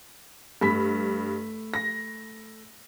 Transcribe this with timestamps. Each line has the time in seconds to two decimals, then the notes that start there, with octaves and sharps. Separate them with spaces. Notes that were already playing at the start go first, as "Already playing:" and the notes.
0.61 G2 A3 B5 B6
1.74 A#6